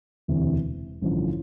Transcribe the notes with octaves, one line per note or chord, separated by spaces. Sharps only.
E1 D2 C3 E3
A1 G2 D3 F3